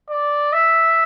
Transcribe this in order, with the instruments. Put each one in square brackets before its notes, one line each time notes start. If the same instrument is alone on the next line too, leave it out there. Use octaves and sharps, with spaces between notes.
[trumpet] D5
E5